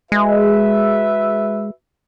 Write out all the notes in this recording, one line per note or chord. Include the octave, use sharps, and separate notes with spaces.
G#3 F#4 B4 E5